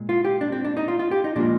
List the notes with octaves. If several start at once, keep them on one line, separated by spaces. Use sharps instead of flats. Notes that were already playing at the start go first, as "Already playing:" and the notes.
Already playing: A#2 G#3
F4
G4
D4
C4
D4
D#4
F4
F4
G4
D#4
A#2 F3 G#3 D4